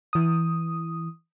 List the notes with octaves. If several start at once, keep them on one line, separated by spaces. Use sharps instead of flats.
E3 D#6